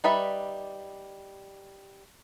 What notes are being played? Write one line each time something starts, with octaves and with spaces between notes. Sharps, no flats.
G3 D#4 B4 D5 E5